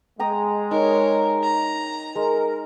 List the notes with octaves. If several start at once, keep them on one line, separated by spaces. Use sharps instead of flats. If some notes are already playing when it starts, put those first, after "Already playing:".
G#3 G5 A#5 D#6
D#4 A#4 C#5
A#5
G#3 A#4